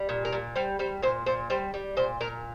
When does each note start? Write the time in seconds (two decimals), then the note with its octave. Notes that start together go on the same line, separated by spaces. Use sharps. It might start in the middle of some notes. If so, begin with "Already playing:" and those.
Already playing: G3
0.09 A#2
0.25 A#4
0.33 A#2
0.55 G3 C5
0.79 G3 C5
1.02 A#2 C5
1.26 A#2 C5
1.50 G3 C5
1.74 G3
1.97 A#2 C5
2.21 A#2 A#4